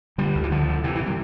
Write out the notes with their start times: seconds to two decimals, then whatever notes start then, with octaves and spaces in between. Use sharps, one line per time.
0.18 D3 G3
0.35 D2
0.44 E3
0.51 D3 F3
0.68 D3
0.84 C3 E3
0.95 E3
1.00 C3
1.06 G3